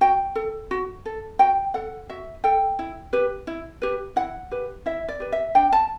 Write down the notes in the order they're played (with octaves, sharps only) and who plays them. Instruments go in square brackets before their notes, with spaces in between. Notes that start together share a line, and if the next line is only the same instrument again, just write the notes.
[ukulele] F#4 G5
A4
F#4
A4
F#4 G5
A4 F#5
F#4 E5
A4 G5
E4
G4 B4
E4
G4 B4
E4 F#5
G4 B4
E4 E5
D5
G4 B4
E5
D4 G5
A5